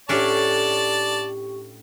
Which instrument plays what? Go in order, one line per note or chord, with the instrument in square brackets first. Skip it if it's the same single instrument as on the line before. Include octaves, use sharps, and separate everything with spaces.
[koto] A2 C#4 D4 [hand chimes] G4 C#6 [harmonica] D5 A5